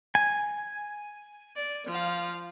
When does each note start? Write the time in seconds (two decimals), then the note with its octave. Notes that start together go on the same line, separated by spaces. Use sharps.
0.15 G#5
1.56 D5
1.87 F3 F5